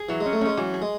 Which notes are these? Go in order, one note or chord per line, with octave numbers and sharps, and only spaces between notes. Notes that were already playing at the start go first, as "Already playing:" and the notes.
Already playing: G#4
E3 F#3
G#3
C#4
A3
G#3 C#4
E3 F#3
G#4
G#3